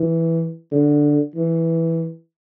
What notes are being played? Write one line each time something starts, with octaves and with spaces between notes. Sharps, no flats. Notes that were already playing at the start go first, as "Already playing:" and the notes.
Already playing: E3
D3
E3